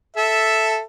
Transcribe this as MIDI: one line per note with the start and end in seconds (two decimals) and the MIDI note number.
0.17 0.80 69
0.17 0.80 76